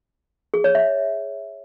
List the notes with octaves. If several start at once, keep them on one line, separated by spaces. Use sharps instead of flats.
G#4
C#5
E5